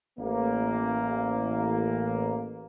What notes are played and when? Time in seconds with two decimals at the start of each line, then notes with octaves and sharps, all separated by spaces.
0.19 A1 A#3